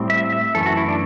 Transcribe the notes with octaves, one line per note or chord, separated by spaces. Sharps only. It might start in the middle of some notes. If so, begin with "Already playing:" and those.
Already playing: A2 G3 C4
E5
E5
F#2 E3 A3 A4
F#4
E4
D4